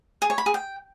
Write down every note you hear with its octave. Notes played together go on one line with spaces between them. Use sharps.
G#4
C#5
B5
G#4
G5